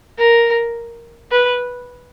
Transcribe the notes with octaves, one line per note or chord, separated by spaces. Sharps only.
A#4
B4